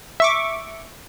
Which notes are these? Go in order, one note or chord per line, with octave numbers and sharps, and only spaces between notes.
E5 C#6 D6